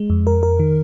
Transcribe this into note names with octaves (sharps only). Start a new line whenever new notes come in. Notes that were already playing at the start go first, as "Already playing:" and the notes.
Already playing: G#3
F2
A#4
A#4
D#3